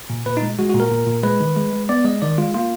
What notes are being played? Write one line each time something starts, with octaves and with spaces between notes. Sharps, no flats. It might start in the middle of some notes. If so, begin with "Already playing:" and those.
A#2
A#2 B4
D#4
G#3
G#3 F#4
F#4
A#2
A#4
A#2
A#2
G#3 B4
D#3
G#3
G#3
B3 D5
G#3 D#5
D#3 D5
G#3 F4
A#3 F4